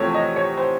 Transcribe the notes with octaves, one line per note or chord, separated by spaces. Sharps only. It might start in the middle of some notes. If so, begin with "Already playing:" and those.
Already playing: E2 C3 F3 A3 C5 C#5
D#5
C#5
C5